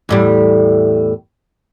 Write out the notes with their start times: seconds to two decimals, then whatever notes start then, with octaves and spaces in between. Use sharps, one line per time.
0.09 E2 A2 G3